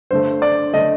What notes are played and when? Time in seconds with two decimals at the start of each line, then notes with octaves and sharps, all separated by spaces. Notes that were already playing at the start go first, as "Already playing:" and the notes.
0.11 G2 D3 A3 C5
0.42 D5
0.74 D3 A3 D#5